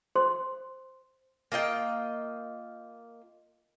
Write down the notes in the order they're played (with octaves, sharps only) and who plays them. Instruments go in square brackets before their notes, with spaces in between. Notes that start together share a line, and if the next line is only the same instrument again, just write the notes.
[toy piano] C5 C6
[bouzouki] A#3 F4 D#5 G5